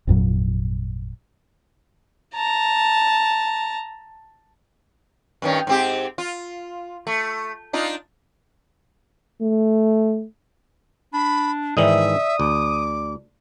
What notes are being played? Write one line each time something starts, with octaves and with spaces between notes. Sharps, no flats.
G#1 F2 A#2 F#3
A5 A#5
G2 D#3 C#4
G#2 C4 G4
F4
A3
D4 D#4 F4
A3
D4 B5
G#2 D#3 E3 D5 E5 D#6
D2 D6